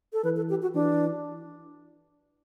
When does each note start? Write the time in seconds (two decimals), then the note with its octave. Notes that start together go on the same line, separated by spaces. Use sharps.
0.13 A4
0.24 E3 B4
0.36 A4
0.50 G4
0.62 F#4
0.75 E3 D4